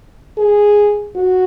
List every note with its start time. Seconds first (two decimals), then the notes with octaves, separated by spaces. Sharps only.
0.38 G#4
1.16 F#4